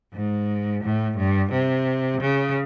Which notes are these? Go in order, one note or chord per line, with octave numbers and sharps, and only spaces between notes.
G#2
A2
G2
C3
C#3